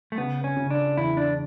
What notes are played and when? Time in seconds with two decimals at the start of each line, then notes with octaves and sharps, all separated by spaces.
0.12 A3
0.18 C#3 B3
0.44 C#4
0.57 C#3
0.71 D4
0.97 E2 E4
1.17 D4